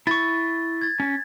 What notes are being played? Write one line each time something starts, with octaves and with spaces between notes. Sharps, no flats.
E4 C#6 A6
G#6 A6
C#4